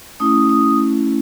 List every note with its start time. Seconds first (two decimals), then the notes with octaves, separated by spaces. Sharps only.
0.20 A3 C#4 E4 D#6
0.49 D#6